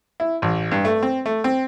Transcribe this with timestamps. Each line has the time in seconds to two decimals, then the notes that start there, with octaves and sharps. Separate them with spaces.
0.20 E4
0.42 A1
0.72 G2
0.85 A3
1.02 C4
1.26 A3
1.44 C4